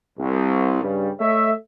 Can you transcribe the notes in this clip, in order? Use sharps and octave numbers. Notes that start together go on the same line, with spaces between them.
C2
G2 C#3 G3
A3 A4 C#5 D#5 E5